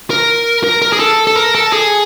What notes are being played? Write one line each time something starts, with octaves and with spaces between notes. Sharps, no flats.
A#4
A#4
A#4
G#4
A4
A4
A#4
A4
G#4